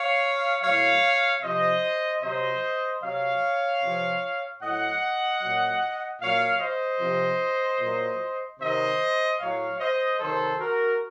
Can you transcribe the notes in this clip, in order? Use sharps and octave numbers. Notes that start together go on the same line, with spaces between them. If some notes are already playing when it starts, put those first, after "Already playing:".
Already playing: C#5 F5
A2 F#3 C#5 F5
C3 F3 C5 D#5
C3 F#3 C5 D#5
C3 F#3 C#5 F5
C3 F3
A2 F#3 D#5 F#5
A#2 F#3
A#2 F#3 C#5 F5
C5 D#5
C3 F3
A#2 F#3
C3 D#3 F#3 C5 D#5
A2 F#3 C#5 F5
C5 D#5
C3 D#3 F#3 A4 C5
F#4 A#4